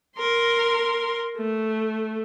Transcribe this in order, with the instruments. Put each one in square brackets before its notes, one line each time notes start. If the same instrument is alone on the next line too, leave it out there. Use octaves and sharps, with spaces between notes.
[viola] A#4 C6
A3